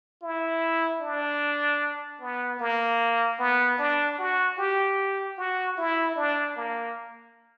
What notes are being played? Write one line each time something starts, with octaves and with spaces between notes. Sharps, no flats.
E4
D4
B3
A#3
B3
D4
F#4
G4
F#4
E4
D4
A#3